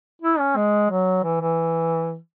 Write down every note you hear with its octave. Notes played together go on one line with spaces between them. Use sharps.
E4
C#4
G#3
F#3
E3
E3